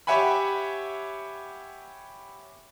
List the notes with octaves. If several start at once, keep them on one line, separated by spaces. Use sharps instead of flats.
G4 C#5 E5 F#5 G#5 B5